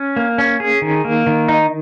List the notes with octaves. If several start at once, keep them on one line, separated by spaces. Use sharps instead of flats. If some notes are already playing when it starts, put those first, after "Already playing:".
Already playing: C#4
A#3
C#4
G#4
D#3
A#3
D#3
D#4